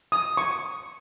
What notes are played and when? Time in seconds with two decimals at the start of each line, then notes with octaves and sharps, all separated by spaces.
0.12 D#6
0.37 C#6